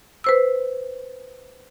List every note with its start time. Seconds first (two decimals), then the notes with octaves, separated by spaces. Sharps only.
0.24 B4 C5 E6